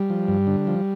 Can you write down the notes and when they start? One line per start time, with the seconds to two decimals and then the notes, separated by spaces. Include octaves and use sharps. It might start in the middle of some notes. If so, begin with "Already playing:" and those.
Already playing: G3
0.10 F3
0.28 G2
0.47 D3
0.67 F3